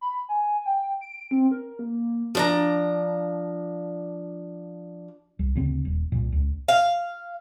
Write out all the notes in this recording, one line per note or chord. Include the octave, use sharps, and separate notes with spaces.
B5
G#5
G5
D7
C4
A#4
A#3
F3 D4 A#5
C2
D2 C#3 C4
D#1
C2 A#2
C#2
F5